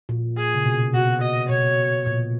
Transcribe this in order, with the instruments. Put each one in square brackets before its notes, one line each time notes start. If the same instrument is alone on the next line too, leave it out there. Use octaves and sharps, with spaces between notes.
[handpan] A#2
[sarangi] G#4
[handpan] C#3
B2
B2
[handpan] B2 [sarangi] F#4
[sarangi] D#5
[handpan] B2 [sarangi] C#5
[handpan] A#2